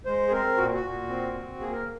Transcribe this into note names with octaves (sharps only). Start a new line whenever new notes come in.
G#3 C5
G#4
C4 A#4
A#2 F#4
F#4
A#2
C4
C4
A#3 G#4
A#4